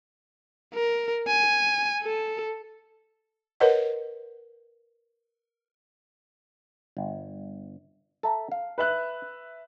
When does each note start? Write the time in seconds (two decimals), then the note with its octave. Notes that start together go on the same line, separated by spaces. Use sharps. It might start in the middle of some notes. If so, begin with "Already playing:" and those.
0.74 A#4
1.28 G#5
2.03 A4
3.60 A#4 B4 C#5 D#5 F#5
6.97 G1
8.23 A4 E5 A#5
8.52 F5
8.78 B4 E5 F#6